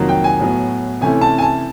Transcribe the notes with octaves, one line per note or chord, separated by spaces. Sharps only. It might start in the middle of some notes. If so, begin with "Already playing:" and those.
Already playing: F2 C3 D#3 F#3 A#3
G5
G#5
A2 F#3 B3
C3 E3 A3 C#4 E4 G#5
A5
G#5
A5